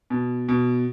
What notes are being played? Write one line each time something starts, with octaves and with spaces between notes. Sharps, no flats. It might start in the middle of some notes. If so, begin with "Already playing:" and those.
B2
B2